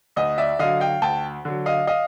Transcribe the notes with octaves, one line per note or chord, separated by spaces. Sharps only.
D2 D#5
D5 E5
D3 F#3 D#5 F5
F5 G5
D2 G5 A5
D3 F#3
D#5 F5
D#5 F5